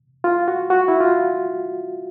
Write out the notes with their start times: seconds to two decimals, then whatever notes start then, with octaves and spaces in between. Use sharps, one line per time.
0.24 F4
0.48 F#4
0.70 F#4
0.88 E4
1.00 F4